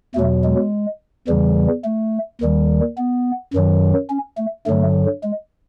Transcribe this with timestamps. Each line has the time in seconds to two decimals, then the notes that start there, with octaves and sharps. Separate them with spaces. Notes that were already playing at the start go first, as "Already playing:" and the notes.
0.15 E2 B2 F#3 A3
0.44 G#3
1.28 E2 C#3 E3 G3
1.85 A3
2.41 D#2 D#3 G3
2.97 B3
3.53 F#2 D#3 F#3
4.10 C#4
4.38 A3
4.66 G2 D3 F#3 A3
5.24 G#3